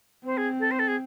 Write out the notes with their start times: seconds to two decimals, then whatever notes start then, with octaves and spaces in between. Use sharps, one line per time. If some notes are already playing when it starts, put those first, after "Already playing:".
0.25 C4 C5
0.37 G#4
0.59 A4
0.71 C5
0.79 A4
0.87 G#4